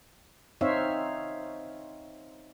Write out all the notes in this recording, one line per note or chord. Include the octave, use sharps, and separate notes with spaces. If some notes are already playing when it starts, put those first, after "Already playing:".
C4 D#4 C5 C#5 E5 F5